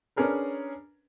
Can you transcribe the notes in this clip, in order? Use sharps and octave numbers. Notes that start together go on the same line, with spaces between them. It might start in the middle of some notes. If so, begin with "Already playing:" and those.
C#4 D4 G#4 A#4 B4